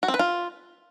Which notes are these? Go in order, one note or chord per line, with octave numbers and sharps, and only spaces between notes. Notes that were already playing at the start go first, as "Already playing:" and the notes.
F#4
C4
B4
F4